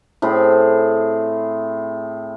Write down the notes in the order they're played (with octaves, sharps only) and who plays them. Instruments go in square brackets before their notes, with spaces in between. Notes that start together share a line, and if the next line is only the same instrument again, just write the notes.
[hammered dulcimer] A2 C4 G#4 B5